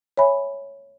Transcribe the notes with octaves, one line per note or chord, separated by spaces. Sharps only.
C#5 E5 G#5 B5